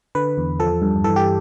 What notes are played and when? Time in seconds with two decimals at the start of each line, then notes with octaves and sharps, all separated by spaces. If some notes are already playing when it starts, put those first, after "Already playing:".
0.15 D3 B4
0.38 E2
0.59 F3 A4
0.82 G2
1.04 E3 A4
1.16 G4